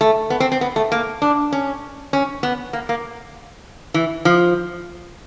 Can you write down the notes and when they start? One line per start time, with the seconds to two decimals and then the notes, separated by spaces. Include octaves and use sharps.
0.01 A3
0.30 B3
0.40 C4
0.52 C4
0.61 B3
0.76 A3
0.92 A#3
1.22 D4
1.52 C#4
2.13 C#4
2.43 B3
2.73 A#3
2.89 A#3
3.94 E3
4.25 F3